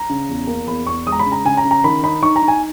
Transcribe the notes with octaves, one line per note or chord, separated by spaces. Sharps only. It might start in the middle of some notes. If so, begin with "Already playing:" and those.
Already playing: A#5
C#3
E2
A#3
E2 B5
E2 C#6
G#3 D#6
A#5
B5
C#3
A#5
C#3 G#5
A#5
C#3
A#5
D#3 B5
D#4 B5
D#4 C#6
A#5
D#4
G#5